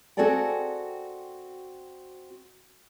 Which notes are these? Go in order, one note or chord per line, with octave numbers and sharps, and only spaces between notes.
C4 F#4 G#4 A4 D5 G5